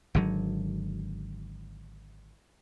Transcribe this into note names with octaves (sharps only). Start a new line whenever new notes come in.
G#1 D3 F#3